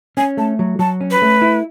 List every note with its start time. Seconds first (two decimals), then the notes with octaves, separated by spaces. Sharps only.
0.17 C#4 G#5
0.37 A3 A5
0.59 F#3
0.79 F#3 A5
1.01 C#4
1.11 B4
1.22 A3
1.42 E4